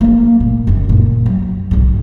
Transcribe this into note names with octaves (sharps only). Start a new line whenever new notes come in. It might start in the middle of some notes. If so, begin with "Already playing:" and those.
A#3 B3
A#2
F#2 D3
A#2
F#3
B1 G#2